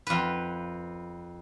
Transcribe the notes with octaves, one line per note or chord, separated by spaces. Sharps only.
F2 B4